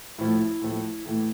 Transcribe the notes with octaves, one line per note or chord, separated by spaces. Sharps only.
A2 F3 A3 E4
A2 F3 A3
A2 E3 A3